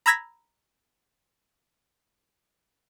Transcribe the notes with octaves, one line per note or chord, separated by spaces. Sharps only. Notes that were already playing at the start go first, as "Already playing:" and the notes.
A#5 B5 E6 G#6 A#6 B6